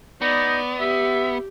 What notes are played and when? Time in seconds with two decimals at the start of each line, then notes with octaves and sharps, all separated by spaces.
0.22 B3 D#4 D5
0.80 G4 E5